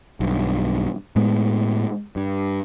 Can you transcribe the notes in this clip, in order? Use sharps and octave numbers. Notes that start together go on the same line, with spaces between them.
B1 G2
A2 G#3 B3
G2